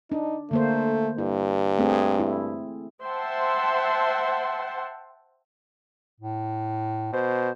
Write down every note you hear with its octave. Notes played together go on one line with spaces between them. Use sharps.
D4 D#4
D3 A3 A#3 C5
G2 E4
A3 C4 G#4
E4
C5 E5 F#5 G5 A5 C6
A2
B2 C5